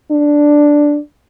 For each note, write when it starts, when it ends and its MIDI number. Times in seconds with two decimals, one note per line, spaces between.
0.11 0.98 62